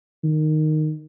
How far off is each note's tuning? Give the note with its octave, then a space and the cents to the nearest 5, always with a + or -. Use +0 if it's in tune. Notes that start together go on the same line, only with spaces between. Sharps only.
D#3 -10